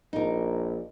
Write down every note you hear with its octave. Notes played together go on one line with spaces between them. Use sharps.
A#1 D#4 A#4